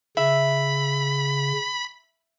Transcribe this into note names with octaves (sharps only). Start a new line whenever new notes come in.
C#3 E5 B5